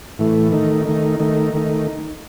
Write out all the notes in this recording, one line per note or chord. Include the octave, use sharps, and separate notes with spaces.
A2 E3 A3
D#3 A3 D#4
D#3 A3 D#4
D#3 A3 D#4
D#3 A3 D#4